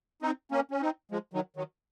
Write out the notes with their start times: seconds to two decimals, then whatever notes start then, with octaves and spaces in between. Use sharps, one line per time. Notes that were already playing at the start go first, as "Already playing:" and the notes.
0.22 C4 D#4
0.51 A#3 C#4
0.71 C#4
0.81 C4 D#4
1.11 F3 G#3
1.33 D#3 F#3
1.56 D#3 F#3